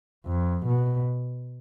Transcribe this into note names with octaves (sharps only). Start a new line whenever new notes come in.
F2
B2